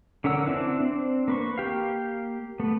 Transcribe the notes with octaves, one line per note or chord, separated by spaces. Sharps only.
D3 C#4 A#4 F#5 E6
C4 D4 E4 B4
C4 D4
A#3 B4 C#6
A#3 G4 F5
A3 B3